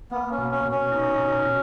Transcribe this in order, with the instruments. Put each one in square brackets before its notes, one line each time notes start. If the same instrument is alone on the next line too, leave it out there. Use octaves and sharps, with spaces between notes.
[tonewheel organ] A#3 [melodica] B3
[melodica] C#4
[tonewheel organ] B2
[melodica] C#4
[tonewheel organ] B2
[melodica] C#4
[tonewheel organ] D#4
B2
B2